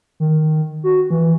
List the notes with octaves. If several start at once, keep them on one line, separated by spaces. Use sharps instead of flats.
D#3
F#4
E3